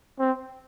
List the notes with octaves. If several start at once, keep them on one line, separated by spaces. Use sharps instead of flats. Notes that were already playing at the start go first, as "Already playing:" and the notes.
C4